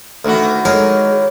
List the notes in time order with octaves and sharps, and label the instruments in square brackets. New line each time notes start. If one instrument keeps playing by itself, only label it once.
[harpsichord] D2 [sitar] D#3 E3 F#4
[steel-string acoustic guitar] G#3 [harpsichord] D#4 G#4 A#4 [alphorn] C#5